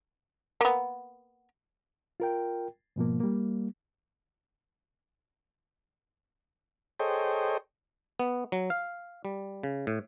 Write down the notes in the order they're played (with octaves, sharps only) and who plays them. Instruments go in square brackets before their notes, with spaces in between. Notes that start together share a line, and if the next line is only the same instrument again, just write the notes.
[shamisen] A#3 B3
[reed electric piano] F4 A#4 G5
G#2 B2 F3 A#3
G3 A#3
[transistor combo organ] G#4 A4 C5 C#5 D#5 G5
[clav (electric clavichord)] B3
F#3
F5
G3
C#3
A2